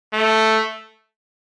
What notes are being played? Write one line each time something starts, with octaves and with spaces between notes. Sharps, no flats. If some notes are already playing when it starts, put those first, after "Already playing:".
A3